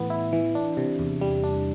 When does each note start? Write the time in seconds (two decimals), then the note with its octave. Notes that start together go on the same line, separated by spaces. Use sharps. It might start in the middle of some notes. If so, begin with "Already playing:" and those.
Already playing: A2 E3 B3
0.10 E4
0.33 E3
0.55 D4
0.77 C3
0.99 E2
1.21 G3
1.44 D4